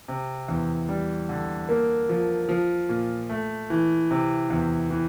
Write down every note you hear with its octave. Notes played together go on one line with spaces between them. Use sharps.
C3
E2
G3
D3
A#3
F3
F3
A#2
A3
E3
C3
E2
E3